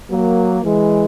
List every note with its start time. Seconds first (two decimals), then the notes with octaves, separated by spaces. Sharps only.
0.11 F#3 A#3
0.64 E3 G#3